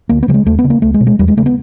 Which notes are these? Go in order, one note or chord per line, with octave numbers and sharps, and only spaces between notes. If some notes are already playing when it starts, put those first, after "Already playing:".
D2 A#3
B3
C#3 G3
G#3
D#2 A3
B3
C#3
A#3
C#2 A3
G#3
B2
G#3
E2 G3
G#3
C#3 A3
B3